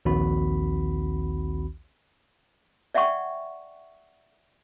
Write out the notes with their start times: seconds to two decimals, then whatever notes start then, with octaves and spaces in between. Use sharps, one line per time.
0.05 A#1 D#2 D#3 C4 F#4 B5
2.95 D5 E5 F#5 G5 C#6